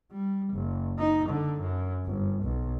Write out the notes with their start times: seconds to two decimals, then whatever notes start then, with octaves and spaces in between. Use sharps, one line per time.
0.11 G3
0.54 F#1
0.99 D#4
1.29 D3
1.60 F#2
2.06 G1
2.43 B1